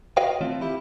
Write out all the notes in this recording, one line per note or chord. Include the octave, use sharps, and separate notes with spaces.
F#4 B4 C#5 D#5 F5 G5
E3 A3 C4 F4
E4 G4